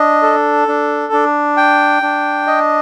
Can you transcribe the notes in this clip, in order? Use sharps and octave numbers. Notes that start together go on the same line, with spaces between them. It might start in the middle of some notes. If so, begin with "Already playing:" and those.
Already playing: D4 D#5
A4
D4
D4
G5
D4
D#5